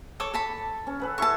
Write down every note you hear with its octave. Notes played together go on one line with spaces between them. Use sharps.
A4 C#5 D6
A4 A5 B5
C#4
A4 B4 F#5
E4 A4 A5 C#6